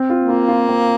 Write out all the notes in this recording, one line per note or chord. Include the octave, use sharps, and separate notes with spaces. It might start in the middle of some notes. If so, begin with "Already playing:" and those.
Already playing: C4
F4
A#3
F4
F4
C4